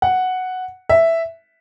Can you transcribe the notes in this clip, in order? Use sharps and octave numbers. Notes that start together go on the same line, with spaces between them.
F#5
E5